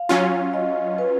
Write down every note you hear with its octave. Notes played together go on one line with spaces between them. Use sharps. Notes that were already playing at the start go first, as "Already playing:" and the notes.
Already playing: F5
F#3 C#4 F4
D#5
B4